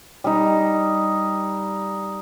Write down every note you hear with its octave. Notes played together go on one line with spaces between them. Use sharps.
G3 D#4